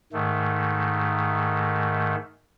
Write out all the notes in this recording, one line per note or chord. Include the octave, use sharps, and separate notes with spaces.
G#2 D#3 A3